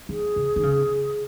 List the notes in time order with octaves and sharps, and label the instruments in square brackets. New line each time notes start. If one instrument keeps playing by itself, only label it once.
[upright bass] D#3 [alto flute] G#4
[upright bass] C#3
D#3
C#3